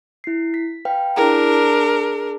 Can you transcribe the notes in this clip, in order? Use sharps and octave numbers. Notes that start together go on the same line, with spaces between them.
E4 C7
B6
B4 F5 G5
D4 E4 G#4 A#4 A#5
G#4